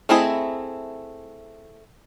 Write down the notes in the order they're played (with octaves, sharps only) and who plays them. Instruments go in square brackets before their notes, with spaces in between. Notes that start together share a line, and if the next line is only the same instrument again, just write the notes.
[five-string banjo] A3 C4 E4 G#4 D#5